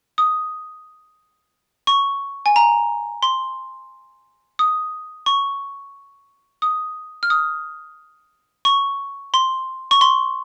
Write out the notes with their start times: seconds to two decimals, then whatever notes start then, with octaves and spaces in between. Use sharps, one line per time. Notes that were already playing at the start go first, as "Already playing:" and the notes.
0.18 D#6
1.87 C#6
2.46 G#5
2.56 A#5
3.23 C6
4.59 D#6
5.26 C#6
6.62 D#6
7.23 F6
7.30 D#6
8.65 C#6
9.34 C6
9.91 C#6
10.01 C6